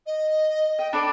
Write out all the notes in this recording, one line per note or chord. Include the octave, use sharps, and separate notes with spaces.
D#5
D#5 G5
D4 A4 D5 B5